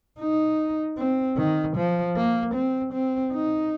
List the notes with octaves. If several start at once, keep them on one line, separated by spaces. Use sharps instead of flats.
D#4
C4
D#3
F3
A#3
C4
C4
D#4